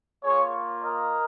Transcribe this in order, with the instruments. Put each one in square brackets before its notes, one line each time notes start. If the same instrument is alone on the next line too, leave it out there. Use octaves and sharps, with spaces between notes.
[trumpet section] A#3 F4 G#4 C#5
A#4 D#5